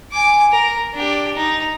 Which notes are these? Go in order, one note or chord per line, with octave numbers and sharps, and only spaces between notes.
G#5 D6
A#4
D4 G4
D#4